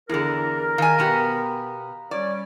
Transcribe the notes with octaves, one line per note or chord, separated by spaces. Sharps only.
E2 D3 E4 G#4 A#4
D#3 F5 G#5 A#5
B2 B3 G4
G3 C#4 C#5 D5